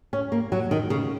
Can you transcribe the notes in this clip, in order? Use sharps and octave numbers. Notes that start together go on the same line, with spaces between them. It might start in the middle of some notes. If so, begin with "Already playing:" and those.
C#4
A#3
F#3
D#3
C#3